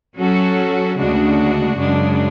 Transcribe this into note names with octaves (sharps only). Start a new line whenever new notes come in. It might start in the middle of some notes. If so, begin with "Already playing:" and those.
F#3 C#4 F#4 A4
D2 C#3 G#3 D4 F#4
F#2 C#3 G#3 D4